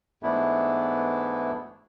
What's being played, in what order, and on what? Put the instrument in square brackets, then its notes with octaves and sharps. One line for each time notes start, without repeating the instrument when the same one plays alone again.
[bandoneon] G#2 E3 A3 B3 D4 E4